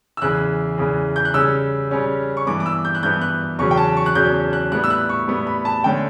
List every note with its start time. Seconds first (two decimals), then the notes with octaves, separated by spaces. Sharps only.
0.17 E6
0.22 E2 C#3 E3 F#6
0.78 E2 C#3 E3
1.16 G6
1.25 F#6
1.34 C#3 G3 C#4 E6
1.91 C#3 G3 C#4
2.37 C#6
2.47 G2 E3 B3 D6
2.60 D6
2.66 E6
2.85 G6
2.95 F#6
3.03 G2 E3 B3 G6
3.21 F#6
3.59 E2 C#3 F#3 C#4 C#6
3.71 G5
3.77 A5
3.97 C#6
4.06 F#6
4.15 E2 C#3 F#3 C#4 G6
4.53 F#6
4.72 A2 G3 B3 F#6
4.84 E6
4.90 F#6
5.09 C#6
5.28 A2 G3 B3
5.47 B5
5.65 A5
5.84 D3 A3 C#4 G5